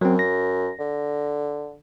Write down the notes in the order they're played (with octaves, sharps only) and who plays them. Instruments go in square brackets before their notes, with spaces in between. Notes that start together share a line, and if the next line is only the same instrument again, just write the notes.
[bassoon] F#2 [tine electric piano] F#3 C4
[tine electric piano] A#6
[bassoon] D3